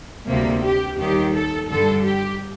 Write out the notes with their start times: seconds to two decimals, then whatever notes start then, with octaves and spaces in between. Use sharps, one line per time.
0.28 D2 C3 G3 A#3
0.63 G4
0.99 D#2 D#3 G3 G4
1.33 A4
1.69 G2 D3 G3 A4
2.04 G4